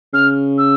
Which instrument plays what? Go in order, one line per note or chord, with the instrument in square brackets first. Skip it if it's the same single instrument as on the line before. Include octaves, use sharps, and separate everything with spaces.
[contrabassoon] C#3 [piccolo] F6
[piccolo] E6